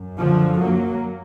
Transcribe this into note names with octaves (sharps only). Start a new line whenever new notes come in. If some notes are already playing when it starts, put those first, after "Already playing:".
Already playing: F#2
D3 F3
F#3 A#3